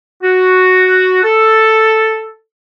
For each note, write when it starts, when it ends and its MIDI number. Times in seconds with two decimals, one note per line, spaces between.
0.22 1.21 66
1.23 2.32 69